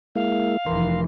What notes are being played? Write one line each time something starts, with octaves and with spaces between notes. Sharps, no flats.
G#3 A#3 E4 F5
F1 E3 A#4 C6